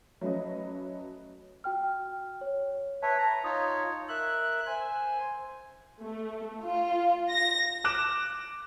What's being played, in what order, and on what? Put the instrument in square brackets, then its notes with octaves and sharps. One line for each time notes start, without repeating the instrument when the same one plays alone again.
[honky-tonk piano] F#3 A3 C#4 B4 D#5
[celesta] F#4 G5 F6
C#5
[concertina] B4 C#5 E5 [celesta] A5
[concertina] A#5
[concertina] D#4 F4 C#5 [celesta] D#6
[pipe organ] A#4 E5 F#6
C5 G#5
[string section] A3
F4
A#6
[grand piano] D6 F#6 E7